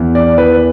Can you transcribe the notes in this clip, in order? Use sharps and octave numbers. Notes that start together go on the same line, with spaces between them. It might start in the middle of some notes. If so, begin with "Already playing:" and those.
Already playing: E2
D5
E3 B4